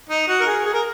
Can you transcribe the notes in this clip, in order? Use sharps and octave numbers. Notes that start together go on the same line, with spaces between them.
D#4
F#4
A#4
G#4
G#4
A#4